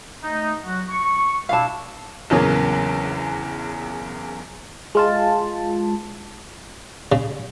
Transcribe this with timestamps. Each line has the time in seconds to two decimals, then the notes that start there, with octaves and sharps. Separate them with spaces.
0.23 A3 D#4
0.64 F#3 F#4
0.89 C#6
1.49 B2 D4 E4 F5 A5
2.30 A#1 E2 C#3 F#3 A#3
4.95 G#3 F4 A5
7.12 C#3